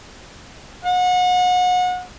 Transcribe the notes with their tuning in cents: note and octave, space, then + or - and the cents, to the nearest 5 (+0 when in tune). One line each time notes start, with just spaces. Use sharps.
F#5 -30